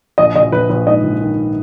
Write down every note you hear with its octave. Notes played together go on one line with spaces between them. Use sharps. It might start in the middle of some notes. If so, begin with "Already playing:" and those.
A#1 D#5
A#1 D#5
A#1 B4
A#1 B4
G#2 D#5
A#1
D#3